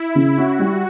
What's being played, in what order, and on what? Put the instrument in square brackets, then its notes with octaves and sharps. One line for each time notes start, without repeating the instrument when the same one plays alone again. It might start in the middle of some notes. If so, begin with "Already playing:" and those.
Already playing: [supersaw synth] E4
[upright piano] C#3
[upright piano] C#4 [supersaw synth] F#4
[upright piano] G3